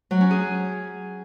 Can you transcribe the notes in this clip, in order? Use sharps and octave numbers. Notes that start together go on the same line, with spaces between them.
F#3
C#4
G#4